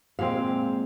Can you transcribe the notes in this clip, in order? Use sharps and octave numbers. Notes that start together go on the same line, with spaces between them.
A#2 G#3 C4 F5